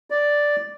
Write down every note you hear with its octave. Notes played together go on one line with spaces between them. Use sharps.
D5